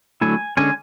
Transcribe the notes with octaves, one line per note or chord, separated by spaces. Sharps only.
D3 F#3 A3 E4 G#5
D3 G#3 C#4 G#5